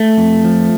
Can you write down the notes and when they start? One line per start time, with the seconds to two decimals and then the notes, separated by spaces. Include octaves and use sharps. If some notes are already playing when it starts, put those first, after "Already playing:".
Already playing: A3
0.17 F2
0.45 F3